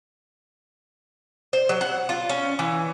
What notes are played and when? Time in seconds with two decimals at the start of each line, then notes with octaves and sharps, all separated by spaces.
1.53 C5
1.69 F#3
1.81 F#5
2.09 F4
2.29 C#4
2.59 E3